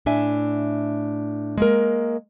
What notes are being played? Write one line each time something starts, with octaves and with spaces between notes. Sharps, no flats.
A2 D4 E5 G#5
G#3 A#3 A#4